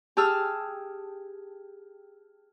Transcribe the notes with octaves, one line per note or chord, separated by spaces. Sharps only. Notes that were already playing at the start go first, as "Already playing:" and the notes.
G4 G#4 A5 E6 F6